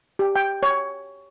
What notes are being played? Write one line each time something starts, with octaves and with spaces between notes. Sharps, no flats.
G4
G5
C#5